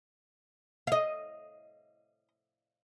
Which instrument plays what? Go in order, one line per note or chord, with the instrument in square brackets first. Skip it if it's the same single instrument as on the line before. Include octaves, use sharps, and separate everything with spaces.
[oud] D#5 F5